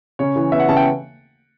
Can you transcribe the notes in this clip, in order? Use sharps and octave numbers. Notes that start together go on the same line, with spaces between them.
C#3 C#5
E3
B3 E5
F#5
C#3 A5
G5